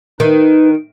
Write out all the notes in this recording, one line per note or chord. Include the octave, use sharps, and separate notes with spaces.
D#3 D#4 B4